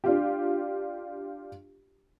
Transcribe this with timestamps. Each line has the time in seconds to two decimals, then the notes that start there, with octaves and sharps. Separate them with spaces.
0.04 D4 F4 G4